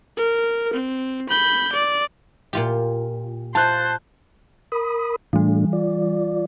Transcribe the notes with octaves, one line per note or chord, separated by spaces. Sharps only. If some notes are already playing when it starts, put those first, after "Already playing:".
A#4
C4
B5 G6
D5
A#2 F4 G4
F4 C5 A5 F#6
A#4 B5 D#6
A2 E3 G3 A3 D4
F4 D5